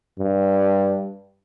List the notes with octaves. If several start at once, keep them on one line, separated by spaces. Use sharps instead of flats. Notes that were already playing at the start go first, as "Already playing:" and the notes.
G2